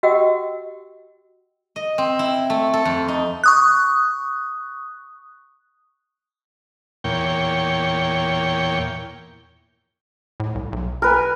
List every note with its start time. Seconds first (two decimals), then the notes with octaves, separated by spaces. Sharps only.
0.03 F#4 G4 D#5 F#5 G5 E6
1.76 D#5
1.98 C4
2.19 E4
2.50 A3
2.73 A4
2.85 F2
3.08 D#4
3.44 C#6 D#6 F#6
7.04 E2 A#2 C#5 G5
10.40 A2
10.55 C2
10.72 B1
11.02 A#4 B4 G#5